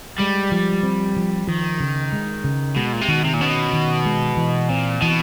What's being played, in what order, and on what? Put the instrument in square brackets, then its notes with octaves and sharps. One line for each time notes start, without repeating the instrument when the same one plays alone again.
[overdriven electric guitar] G3 [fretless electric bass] G#3
[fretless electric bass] F3
C4
F3
[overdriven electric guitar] D#3 [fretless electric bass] F3
[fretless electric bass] C#3
G#3
C#3
[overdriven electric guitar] B2 [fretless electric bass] G#3
[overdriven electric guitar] A#2
C3
[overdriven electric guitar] B2 [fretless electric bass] D#3
[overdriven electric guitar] C3
A#2
[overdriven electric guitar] B2 [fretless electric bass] C#4
[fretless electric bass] D#3
G#3
E3
[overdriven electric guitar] A#2 [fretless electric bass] C4
[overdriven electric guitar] B2 [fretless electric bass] E3